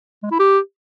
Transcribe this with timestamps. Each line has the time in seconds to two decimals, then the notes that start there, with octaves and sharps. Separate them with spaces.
0.23 G#3
0.31 E4
0.39 G4